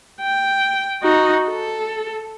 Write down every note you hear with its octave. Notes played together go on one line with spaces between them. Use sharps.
G5
D#4 F#4
A4